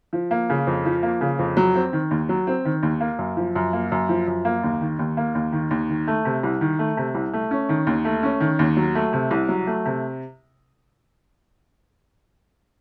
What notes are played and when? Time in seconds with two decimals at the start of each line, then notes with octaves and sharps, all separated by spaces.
0.13 F3
0.31 A#3
0.50 C#3
0.67 F2
0.85 F3
1.03 A#3
1.21 C#3
1.39 F2
1.57 F#3
1.75 C4
1.93 D#3
2.11 D#2
2.29 F#3
2.47 C4
2.65 D#3
2.83 D#2
3.01 A#3
3.19 F#2
3.37 F3
3.55 F#2
3.73 A#3
3.92 F#2
4.09 F3
4.27 F#2
4.45 A#3
4.64 D#2
4.81 D#3
4.99 D#2
5.17 A#3
5.35 D#2
5.52 D#3
5.71 D#2
5.89 D#3
6.08 A3
6.25 C3
6.43 C2
6.61 D#3
6.79 A3
6.97 C3
7.14 C2
7.33 A3
7.51 C#4
7.69 D#3
7.87 D#2
8.05 A3
8.23 C#4
8.40 D#3
8.59 D#2
8.77 F#3
8.95 A3
9.13 C3
9.31 C2
9.49 F#3
9.67 A3
9.85 C3